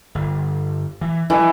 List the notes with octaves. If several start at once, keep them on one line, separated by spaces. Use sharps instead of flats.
G1
E3
E3 F3 G3